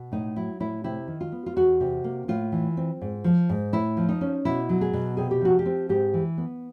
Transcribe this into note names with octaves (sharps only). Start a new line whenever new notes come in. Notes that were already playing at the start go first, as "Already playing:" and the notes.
Already playing: B2
A2 D#4
F#3 E4
A2 E4
C3 E4
D#3
F4
B3
F4
E2 F#4
C3
A#3
A2 F4
E3
C4
G#2
F3
G#2
A2 E4
F3
D#4
C#4
B2 E4
F#3
G#4
B2
C3 G#4
G4
F3 F#4
G4
C4
G#2 G4
E3
B3